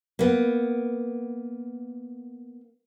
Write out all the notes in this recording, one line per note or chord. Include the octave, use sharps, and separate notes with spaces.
A#3 B3